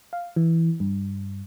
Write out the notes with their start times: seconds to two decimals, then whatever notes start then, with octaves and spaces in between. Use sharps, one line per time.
0.13 F5
0.36 E3
0.80 G2